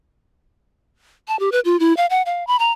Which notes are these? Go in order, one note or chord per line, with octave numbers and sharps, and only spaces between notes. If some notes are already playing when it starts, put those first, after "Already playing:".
A5
G4
B4
F4
E4
F5
F#5
F5
B5
A#5